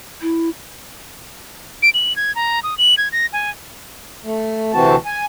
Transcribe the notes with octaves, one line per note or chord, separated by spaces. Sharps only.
E4
D7
F#7
G#6
A#5
D#6
F#7
G#6
A#6
G#5
A3
D2 C3 E3 C4 F#4 A5
G#5